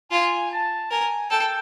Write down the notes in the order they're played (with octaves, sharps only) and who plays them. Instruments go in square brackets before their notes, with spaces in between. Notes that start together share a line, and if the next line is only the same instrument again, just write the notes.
[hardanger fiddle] F4 [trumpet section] G#5
[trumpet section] A5
[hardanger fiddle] A#4 [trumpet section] G#5
[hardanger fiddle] A4 [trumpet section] G5